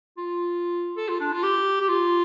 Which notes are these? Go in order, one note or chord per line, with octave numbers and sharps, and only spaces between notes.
F4
A4
F4
D4
F4
G4
G4
F4